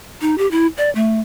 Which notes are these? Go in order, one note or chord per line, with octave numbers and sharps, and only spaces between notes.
D#4
G4
E4
D5
A3